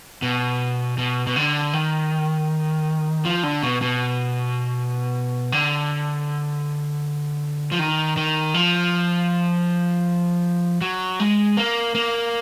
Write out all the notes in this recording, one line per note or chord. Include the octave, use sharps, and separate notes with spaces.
B2
B2
B2
D3
D#3
F3
D3
B2
B2
D3
F3
D#3
D#3
F3
F#3
G#3
A#3
A#3